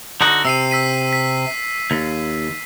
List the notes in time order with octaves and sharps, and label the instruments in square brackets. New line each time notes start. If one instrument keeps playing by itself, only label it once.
[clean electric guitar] D3 D#4 F#4
[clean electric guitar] C3 [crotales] E6 C7 D#7
[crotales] E6 B6 D#7
B6
[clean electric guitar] D#2